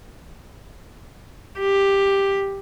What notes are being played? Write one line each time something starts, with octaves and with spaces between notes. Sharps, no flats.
G4